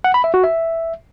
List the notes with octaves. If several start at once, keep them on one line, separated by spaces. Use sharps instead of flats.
F#5
B5
E5
F#4
E5